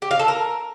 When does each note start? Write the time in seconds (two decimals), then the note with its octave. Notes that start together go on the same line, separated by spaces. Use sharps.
0.02 G4
0.11 F5
0.19 A4
0.28 A#4